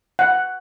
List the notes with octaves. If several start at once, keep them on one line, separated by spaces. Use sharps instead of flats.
F#5